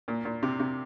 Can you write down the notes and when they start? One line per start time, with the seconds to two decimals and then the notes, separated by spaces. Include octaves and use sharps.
0.08 A#2
0.25 A#2
0.43 C3
0.59 C3